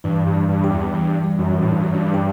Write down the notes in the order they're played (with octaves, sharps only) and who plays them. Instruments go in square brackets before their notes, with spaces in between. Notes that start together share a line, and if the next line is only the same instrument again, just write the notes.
[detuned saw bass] G2 [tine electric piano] E3
[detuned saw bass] G2
[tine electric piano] G3
[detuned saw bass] G2
[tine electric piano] G4
[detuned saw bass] E2
[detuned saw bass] G2 [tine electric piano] E3
[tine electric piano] G3
[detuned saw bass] F#2
[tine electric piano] E3
[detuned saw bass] A2
G2
[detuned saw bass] F#2 [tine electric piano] G3
[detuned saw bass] G2
[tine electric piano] G4